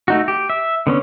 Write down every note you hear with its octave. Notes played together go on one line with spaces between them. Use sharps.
A3 D#4 F#4
G4
E5
D3 B3 C#4